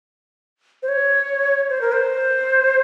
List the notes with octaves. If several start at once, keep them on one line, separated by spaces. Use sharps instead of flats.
C5
C#5
C5
A#4
C5